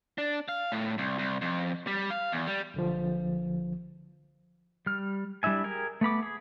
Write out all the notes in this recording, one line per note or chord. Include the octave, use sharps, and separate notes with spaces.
D4
F5
A2
C2
C2
F2
G3
F5
E2
G3
B1 D3 F3
G3 F6
G3 D4 E4 E5 G#5
G4 G#4 A#4 G#5
A3 B3 B5 D6
G#4